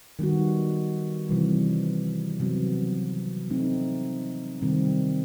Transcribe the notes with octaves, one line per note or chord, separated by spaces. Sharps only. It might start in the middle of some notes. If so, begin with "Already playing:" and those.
D#3 G3 B3 F#4
C3 E3 G3
C3 F#3 B3
A3 C4 D#4
C3 D#3 G3 C4